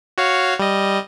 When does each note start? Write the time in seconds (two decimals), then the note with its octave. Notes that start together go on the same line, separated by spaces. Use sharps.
0.18 F#4 C#5 F5
0.59 G3 D#5